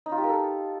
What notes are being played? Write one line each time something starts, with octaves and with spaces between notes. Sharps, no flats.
D#4
F4
G4
A#4
A4